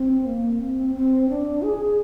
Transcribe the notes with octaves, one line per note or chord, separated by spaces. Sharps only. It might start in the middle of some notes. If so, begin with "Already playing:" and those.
Already playing: C4
A#3
C4
C4
D4
G#4